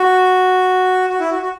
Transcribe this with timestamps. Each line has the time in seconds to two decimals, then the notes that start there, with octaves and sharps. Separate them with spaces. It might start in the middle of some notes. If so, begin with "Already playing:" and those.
Already playing: F#4
1.10 F#4
1.20 E4
1.30 F#4
1.42 F#4